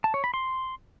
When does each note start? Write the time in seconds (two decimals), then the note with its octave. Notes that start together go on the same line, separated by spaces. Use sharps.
0.04 A5
0.14 C#5
0.24 B5
0.34 C6